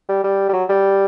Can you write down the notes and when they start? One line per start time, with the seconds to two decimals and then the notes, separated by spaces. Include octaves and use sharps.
0.09 G3
0.24 G3
0.49 G3
0.53 F#3
0.69 G3